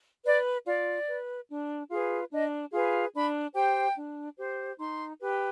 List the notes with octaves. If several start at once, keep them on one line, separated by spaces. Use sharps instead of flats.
B4 D5
F4 D5
B4
D4
F4 G#4 B4
D4 D#5
F4 G#4 B4
D4 B5
G4 C5 G5
D4
G4 C5
D#4 C6
G4 B4